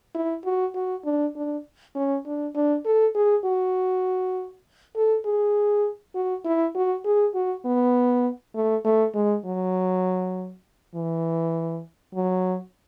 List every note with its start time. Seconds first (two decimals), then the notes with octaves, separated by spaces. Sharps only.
0.15 E4
0.45 F#4
0.75 F#4
1.05 D4
1.36 D4
1.95 C#4
2.26 D4
2.55 D4
2.85 A4
3.15 G#4
3.45 F#4
4.96 A4
5.25 G#4
6.15 F#4
6.45 E4
6.75 F#4
7.05 G#4
7.35 F#4
7.65 B3
8.55 A3
8.84 A3
9.15 G#3
9.45 F#3
10.95 E3
12.15 F#3